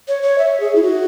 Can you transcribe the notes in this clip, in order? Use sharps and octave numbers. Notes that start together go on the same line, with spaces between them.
C#5
C#5
E5
G#4
E4
F#4